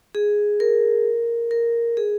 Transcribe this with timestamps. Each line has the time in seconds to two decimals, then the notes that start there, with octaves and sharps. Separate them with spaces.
0.15 G#4
0.60 A#4
1.51 A#4
1.97 G#4